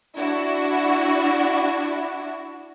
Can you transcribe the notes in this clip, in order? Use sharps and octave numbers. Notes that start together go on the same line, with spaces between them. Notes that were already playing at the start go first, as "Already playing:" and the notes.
D4 E4 F#4